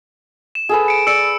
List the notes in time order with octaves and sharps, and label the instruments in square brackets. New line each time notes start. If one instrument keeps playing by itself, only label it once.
[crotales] E7
[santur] G#4 A4 B4
[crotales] C#7 D7
[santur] D5 [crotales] E6 C#7 D7